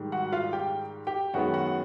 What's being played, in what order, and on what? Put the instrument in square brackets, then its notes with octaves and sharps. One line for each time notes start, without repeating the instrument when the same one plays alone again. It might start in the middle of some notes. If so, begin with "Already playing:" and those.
Already playing: [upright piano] G#2 D#3 G3
F#4 F#5
F4 F5
G4 G5
G4 G5
F#2 D#3 G#3 B3 F#4 F#5
F#4 F#5